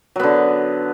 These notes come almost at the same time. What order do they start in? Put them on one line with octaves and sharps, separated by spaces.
F#3 B3 D3